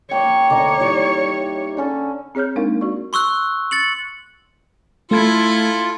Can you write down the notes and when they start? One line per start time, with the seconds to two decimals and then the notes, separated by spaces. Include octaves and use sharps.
0.11 A#3 C#5 G5
0.50 D2 D3 D#5 A#5 D6
0.80 G3 D#4 E4
1.77 D3 C#4 A4
2.35 C4 G#4 C#5 F6 G6
2.56 G#3 A#3 D4 D#4 A#4 F5
2.81 F#4 D5 C#6
3.13 C6 C#6 E6 F#6
3.71 A6 C#7 F#7
5.11 A3 E4 F4 A4 G#6